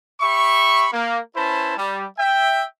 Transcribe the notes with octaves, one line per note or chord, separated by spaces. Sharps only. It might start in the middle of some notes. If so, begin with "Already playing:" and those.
G4 E5 B5 C#6
A#3
C#4 E4 B4 C5 A5 B5
G3
E5 G5